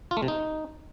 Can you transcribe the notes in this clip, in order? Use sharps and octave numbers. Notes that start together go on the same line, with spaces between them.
F4
A3
C3
D#4